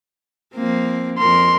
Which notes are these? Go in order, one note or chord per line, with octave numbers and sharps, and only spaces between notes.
F3 A#3 C4
F2 A#4 C6